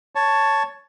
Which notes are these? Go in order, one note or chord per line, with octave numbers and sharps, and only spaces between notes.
C#5 A5